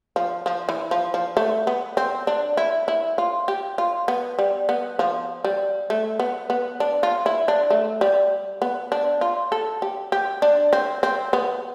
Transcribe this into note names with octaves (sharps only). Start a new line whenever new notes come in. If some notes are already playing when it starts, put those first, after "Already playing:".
F3
F3
E3
F3
F3
A3
B3
C4
D4
E4
E4
F4
G4
F4
B3
G3
B3
F3
G3
A3
B3
B3
D4
F4
E4
D4
A3
G3
B3
D4
F4
A4
G4
G4
D4
C4
C4
B3